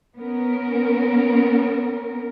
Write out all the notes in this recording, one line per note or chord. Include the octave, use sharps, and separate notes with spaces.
B3 C#4 A#4